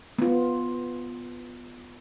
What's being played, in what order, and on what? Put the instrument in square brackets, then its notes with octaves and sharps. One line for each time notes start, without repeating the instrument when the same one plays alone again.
[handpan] B3 F4